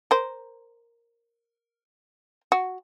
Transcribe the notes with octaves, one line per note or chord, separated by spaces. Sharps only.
A#4 C5
F#4